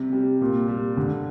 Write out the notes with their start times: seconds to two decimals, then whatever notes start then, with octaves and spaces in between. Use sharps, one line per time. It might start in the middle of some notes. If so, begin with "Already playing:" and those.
Already playing: C3 G3
0.13 G3
0.41 A#2
0.68 G3
0.97 D3